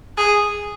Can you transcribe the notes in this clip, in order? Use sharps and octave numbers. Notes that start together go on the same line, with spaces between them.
G#4